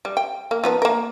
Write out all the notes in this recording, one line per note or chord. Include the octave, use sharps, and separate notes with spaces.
G3
G5
A#3
F3 B3 D#4
A#3 A#4